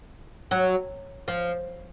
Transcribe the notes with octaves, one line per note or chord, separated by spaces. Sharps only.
F#3
F3